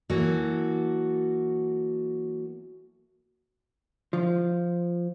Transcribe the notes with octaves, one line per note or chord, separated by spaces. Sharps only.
E3 F#3 A#3 F#4 A4
F3